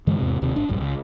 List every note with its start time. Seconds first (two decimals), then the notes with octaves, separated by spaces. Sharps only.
0.07 G2 D3 E3 G#3
0.19 E2 G#2 C3
0.41 D#1 D#2 C3
0.56 G#1 D4
0.69 F1 A#1 G2
0.81 C#2